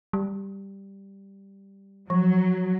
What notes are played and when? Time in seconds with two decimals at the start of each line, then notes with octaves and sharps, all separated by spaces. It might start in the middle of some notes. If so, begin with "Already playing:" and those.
0.13 G3
2.10 F3 F#3